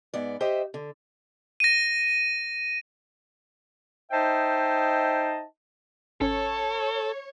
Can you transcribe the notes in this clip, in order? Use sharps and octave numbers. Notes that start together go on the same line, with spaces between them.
G#2 B3 D5
G4 C5 D#5 E5
D3
A#6 D#7
D#4 C5 D#5 E5 G5 A5
G#1 C#4 A4 C#5